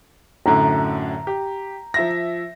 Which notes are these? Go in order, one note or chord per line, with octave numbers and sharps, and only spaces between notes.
F#2 A2 D3 A#5
G4
F3 E5 A#6